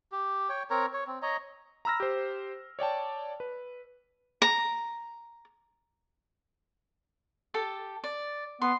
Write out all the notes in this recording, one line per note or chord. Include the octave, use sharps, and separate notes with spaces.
G4
C#5 G5
C4 A#4 C#5 A#5
C#5
C4
C#5 D#5 A#5
A#5 B5 E6 F6 A#6
G4 C5
C#5 D5 G5 A5
B4
A#5
G4 A4 A5
D5
B3 C6